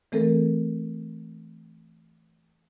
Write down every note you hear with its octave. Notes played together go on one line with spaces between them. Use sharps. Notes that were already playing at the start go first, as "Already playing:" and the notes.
E3 A3 C4 A4 A#4